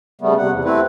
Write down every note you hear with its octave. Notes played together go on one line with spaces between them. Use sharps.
C#3 G3 A3 B3
C3 F#5
E2
A3 C4 E4 B4